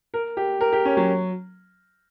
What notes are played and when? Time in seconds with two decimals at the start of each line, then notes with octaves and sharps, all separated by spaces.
0.14 A#4
0.37 G4
0.61 A#4
0.73 G4
0.85 C#4
0.97 F#3